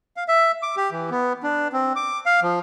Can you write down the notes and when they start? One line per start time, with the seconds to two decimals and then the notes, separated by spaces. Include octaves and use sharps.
0.17 F5
0.28 E5
0.63 D6
0.77 G4
0.92 E3
1.10 B3
1.43 D4
1.73 C4
1.96 D6
2.26 F5
2.42 F3